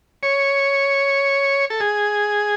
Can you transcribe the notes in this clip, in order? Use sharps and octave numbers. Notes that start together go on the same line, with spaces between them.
C#5
A4
G#4